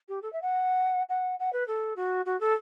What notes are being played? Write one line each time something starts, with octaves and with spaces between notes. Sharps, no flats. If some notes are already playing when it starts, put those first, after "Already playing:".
G4
A4
E5
F#5
F#5
F#5
B4
A4
F#4
F#4
A4